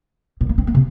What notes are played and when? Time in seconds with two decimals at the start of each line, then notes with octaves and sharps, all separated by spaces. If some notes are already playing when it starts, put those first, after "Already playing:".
0.41 A#2
0.49 A#3
0.58 C4
0.67 A#3
0.75 C3